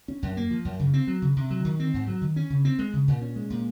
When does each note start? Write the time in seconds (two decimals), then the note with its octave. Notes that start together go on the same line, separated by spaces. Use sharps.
0.08 C#4
0.22 F#2
0.37 A#3
0.51 F3
0.65 F#2
0.79 C#3
0.93 C4
1.07 F#3
1.22 C#3
1.36 C3
1.50 F#3
1.65 D#3
1.80 C4
1.94 G#2
2.07 F#3
2.22 D#3
2.36 C#4
2.50 C#3
2.65 C4
2.79 G#3
2.93 C#3
3.08 A#2
3.22 C#4
3.36 G#3
3.50 A#2